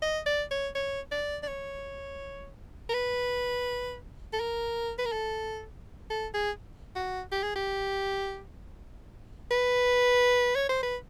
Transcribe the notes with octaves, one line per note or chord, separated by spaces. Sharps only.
D#5
D5
C#5
C#5
D5
D5
C#5
A#4
B4
A4
A#4
B4
A#4
A4
A4
G#4
F#4
G4
G#4
G4
B4
C#5
C5
B4